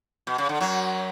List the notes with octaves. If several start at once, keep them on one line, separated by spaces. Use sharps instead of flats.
B2
C#3
D3
F#2 F#3